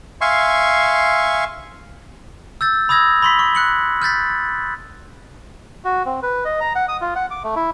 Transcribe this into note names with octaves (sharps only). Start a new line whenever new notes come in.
E5 F5 G#5 C6 C#6
E6 G6 A6
B5 D#6 E6 G#6 A#6
B5 C6 B6
C#6
F#6 C#7 F#7
F6 G6 A6 B6
F#4
C4
B4
D#5
A#5
F#5
D#6
F4
F#5
D6
A3
E4